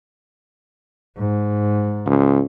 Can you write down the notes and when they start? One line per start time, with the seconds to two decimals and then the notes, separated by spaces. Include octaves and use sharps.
1.17 G#2
2.06 C#2